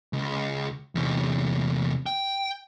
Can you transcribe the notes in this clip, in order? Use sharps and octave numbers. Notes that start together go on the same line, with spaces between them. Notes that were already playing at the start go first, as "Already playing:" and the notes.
C#2
E2 C3
G5